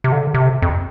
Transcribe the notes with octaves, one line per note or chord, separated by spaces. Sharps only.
C3
D3
C3
F2